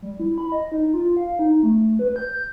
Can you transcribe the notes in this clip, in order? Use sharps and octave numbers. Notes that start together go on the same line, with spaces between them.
G3
E4
B5
D#5
D#4
F4
F5
D#4
A3
B4
G6
G6